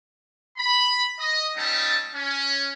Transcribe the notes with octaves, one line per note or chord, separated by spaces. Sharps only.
B5
D#5
G3 A3 C#4 D#4 A5
C#4